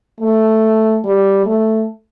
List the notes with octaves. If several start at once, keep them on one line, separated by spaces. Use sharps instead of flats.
A3
G3
A3